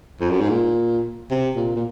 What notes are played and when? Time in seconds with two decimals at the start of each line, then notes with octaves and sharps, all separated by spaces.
0.20 F2
0.30 F#2
0.40 G#2
0.50 A#2
1.31 C3
1.57 A#2
1.76 A#2